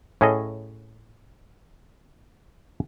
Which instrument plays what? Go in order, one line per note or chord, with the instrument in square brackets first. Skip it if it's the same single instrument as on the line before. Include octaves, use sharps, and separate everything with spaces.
[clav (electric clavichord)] A2 C#4 G#4 A4 D#5